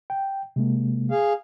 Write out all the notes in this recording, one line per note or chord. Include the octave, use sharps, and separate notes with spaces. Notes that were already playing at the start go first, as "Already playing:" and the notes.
G5
C3 G#3 A#3
G#4 F5